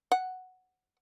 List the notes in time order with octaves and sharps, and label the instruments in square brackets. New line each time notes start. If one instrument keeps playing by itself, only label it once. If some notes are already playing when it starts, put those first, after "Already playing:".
[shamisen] F#5